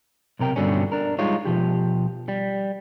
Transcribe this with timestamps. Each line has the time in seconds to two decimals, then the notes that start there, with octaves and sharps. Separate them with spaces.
0.39 B1 C3 A#4 G5
0.56 G2 B2 D3 G3 C#4
0.92 D4 A#4
1.19 G3 G#3 D#4 F4 C#5
1.45 B2 F3 G4
2.28 G3